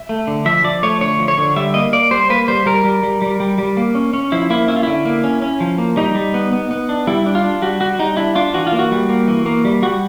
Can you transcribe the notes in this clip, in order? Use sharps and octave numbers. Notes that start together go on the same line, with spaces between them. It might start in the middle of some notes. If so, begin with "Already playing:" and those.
Already playing: E5
A3
D3
F3 E5
F3 D5
A3 C#5
D3 C#5
F3
C#5
D3
G3 E5
A#3 D#5
A#3 D5
G3 C5
A#3 B4
G3 C5
G3 A#4
G3
G3
G3
G3
G3
A#3
C#4
C#4
F3 E4
A#3 E4
C#4 E4
F4
D3 E4
A#3
C#4
C#4
F3
A#3
G3 D#4
G3
B3
B3
B3
D4
G3 E4
D4
F4
D4
G3 F#4
G3 F#4
G3 D#4
D4 E4
D4 F4
E3 F#4
F4
A#3
F#4
G3
A#3
E3
A#3
G3
G3 F#4